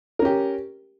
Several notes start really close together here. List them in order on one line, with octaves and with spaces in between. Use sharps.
A#4 C#4 G4